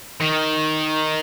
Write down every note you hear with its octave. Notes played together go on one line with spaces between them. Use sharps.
D#3